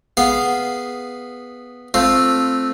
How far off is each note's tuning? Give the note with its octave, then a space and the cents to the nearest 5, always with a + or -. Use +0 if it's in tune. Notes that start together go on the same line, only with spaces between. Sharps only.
B3 +0 G#4 +0 F5 +0
A3 -5 C4 +0 F4 +0